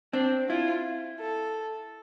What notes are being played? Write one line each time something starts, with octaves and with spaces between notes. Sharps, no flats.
C4 D4
E4 F4
A4